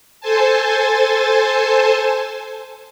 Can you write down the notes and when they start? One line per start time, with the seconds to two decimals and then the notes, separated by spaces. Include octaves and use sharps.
0.20 A4 C5 G#5 A5